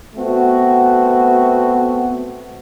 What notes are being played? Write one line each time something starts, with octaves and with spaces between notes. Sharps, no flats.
A3 B3 C4 F#4